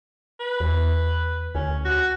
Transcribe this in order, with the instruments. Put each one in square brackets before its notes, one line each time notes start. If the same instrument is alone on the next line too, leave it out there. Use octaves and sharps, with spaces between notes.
[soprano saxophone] B4
[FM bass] E2
[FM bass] D2 [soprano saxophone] C#4
[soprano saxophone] F#4